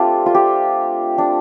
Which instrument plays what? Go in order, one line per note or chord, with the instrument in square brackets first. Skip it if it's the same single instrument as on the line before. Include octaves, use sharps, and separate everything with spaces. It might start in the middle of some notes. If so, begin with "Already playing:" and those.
Already playing: [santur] A3 C4 D4 F4 G4
F4
G4
D4